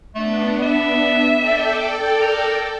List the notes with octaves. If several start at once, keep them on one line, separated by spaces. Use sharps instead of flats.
A3 B3 D4
E5
A4 D5 G5
A#4